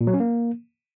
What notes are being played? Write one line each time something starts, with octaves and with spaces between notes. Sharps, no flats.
A#2
F#3
C#4
A#3